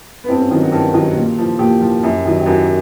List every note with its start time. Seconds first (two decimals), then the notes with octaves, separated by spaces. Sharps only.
0.24 B3
0.29 G2 C4
0.39 C#4
0.51 D#3 F#3
0.62 F#4
0.72 G2 G4
0.94 D#3 F#3
1.16 A#2
1.38 F3
1.59 A#2 G4
1.81 F3
2.03 F#2
2.25 D#3 F#3
2.40 G4
2.46 F#2 F#4